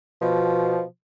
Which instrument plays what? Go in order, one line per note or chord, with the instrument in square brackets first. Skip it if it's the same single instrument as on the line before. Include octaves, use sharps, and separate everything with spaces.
[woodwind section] B2 F3